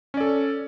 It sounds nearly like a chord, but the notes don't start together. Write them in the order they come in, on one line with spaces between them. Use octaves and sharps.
C#4 D5 A4